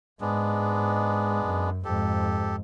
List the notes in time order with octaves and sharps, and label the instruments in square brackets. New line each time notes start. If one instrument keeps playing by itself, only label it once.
[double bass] G#2 [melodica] G#3 B3 D4
[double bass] F#2
[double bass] F2 G#2 [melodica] G4 A4